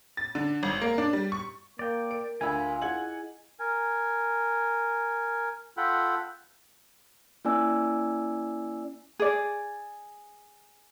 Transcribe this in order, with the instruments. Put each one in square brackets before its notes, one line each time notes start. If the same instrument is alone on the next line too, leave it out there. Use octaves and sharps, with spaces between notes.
[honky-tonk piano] A6
D3
G#1
A#3
D4
G3
C#6
[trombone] A#3 [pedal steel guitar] D5 G5
[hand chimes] A#4 [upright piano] D7
[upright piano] D2 B5 E6 [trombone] F4 [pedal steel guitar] G#5
[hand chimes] E4 G#4 D#5 [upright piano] F#5 G#6 F#7
[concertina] A#4 G#5
F4 A4 F#5 G5 B5
[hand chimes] A#3 C#4 E4 D5 G#5 E6
[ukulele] G#4 D5